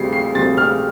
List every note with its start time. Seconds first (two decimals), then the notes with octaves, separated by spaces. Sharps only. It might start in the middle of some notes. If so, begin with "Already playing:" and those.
Already playing: D2 C3 G3 C7
0.13 C7
0.35 D2 C3 G3 A6
0.57 F6